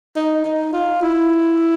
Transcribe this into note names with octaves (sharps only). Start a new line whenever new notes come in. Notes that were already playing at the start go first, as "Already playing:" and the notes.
D#4
D#4
F4
E4